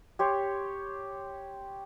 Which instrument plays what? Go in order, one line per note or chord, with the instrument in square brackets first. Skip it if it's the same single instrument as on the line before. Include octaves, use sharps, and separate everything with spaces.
[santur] G4 C#5 C6